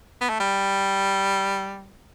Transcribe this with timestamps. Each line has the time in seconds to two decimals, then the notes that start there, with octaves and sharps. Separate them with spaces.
0.21 B3
0.29 A3
0.40 G3